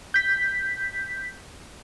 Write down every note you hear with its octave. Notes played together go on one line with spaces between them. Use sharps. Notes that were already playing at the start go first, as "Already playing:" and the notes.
G6 B6